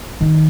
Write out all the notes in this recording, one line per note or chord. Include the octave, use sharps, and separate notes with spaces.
D#3